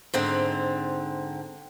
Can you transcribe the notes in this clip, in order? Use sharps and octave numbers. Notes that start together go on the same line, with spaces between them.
G#2 D3 C4